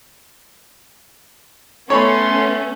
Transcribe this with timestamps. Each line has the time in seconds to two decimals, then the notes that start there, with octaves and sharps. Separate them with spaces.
1.90 A3 B3 C#4 A4 C#5 B5 C6